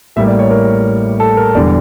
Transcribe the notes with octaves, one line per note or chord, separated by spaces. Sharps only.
A1 A2 G3 A#3 E5
D5
C#5
A#4
A4
A#4
E1 E2 D3 G3 D5